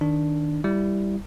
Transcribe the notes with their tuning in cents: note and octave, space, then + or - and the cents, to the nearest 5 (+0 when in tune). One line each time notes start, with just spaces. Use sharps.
D#3 +0 D4 +0
G3 +0 E4 +10